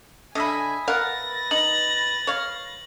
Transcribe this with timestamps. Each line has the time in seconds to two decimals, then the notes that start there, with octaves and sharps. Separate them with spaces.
0.35 D3 D#5 E5 G#5 B5
0.88 A#4 B4 F5 F#5 A6 A#6
1.51 D#4 F#7
2.27 C#5 F5